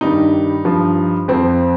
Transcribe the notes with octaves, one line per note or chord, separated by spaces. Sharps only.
G2 D#3 G3 D#4
G2 F3
F2 F3 C4